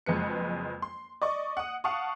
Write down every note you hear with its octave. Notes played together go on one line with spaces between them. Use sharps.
F#1 F2 G#3 B4 C#7
C6
D5 D#5 C#6
F#5 D#6
F5 F#5 A5 C#6 D#6